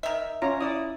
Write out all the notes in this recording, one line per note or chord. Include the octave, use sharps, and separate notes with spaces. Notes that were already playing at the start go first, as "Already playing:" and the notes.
D#3 E5
C#4 F4 C#5 A#5
E4 D5 D#6